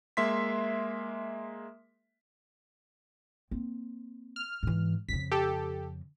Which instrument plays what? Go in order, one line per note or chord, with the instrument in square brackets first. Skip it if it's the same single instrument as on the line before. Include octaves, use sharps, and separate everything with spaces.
[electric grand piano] G#3 A#3 E5 C6 B6
[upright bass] A#3 C4
[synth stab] F6
[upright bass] G#2 E3
[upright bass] F2 C#3 [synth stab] B6
[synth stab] G4 A4